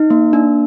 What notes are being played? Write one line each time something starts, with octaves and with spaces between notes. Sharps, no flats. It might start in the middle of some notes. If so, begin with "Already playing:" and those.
Already playing: D#4
A#3
D4